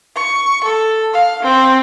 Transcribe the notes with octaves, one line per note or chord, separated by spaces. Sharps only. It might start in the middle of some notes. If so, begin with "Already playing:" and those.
C#6
A4
F5
C4